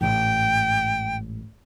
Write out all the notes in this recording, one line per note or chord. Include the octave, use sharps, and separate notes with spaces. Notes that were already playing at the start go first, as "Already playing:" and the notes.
A1 G#2 G5